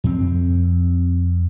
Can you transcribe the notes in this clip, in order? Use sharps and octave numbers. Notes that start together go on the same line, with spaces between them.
F2 C4